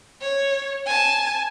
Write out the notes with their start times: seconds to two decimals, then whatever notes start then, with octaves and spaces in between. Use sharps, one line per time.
0.21 C#5
0.86 G#5 A5